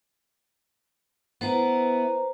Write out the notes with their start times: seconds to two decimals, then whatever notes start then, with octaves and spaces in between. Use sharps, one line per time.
1.41 B3 E4 B4 C5 A#5